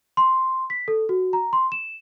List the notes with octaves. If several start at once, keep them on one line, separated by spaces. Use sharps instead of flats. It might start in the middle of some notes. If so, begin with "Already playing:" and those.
C6
B6
A4
F#4
A#5
C6
E7